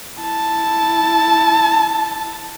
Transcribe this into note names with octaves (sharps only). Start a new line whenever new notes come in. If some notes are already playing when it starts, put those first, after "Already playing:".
E4 A5